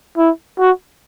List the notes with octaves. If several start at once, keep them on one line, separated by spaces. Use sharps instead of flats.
E4
F#4